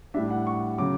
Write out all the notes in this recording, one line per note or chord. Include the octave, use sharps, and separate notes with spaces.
A2 G3 D4 E5
F#5
C#6
C#3 F#3 D6